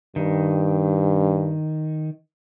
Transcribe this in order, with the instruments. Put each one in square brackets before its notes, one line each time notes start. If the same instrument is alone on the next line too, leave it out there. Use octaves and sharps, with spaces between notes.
[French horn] G2 [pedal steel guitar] D#3